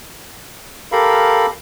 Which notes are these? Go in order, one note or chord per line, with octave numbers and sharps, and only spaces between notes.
G4 A4 A#4 F5 B5